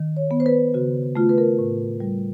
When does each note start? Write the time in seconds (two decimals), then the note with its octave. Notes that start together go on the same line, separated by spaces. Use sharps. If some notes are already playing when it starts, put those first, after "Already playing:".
Already playing: D#3
0.17 C#5
0.31 B3
0.40 C5
0.46 B4
0.74 C#3 F#4
1.16 A3 F4
1.29 B4
1.38 A#4
1.59 A2
2.00 G3